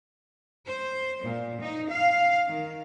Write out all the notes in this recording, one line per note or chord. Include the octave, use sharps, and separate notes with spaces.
C5
A#2
D#4
F5
D#3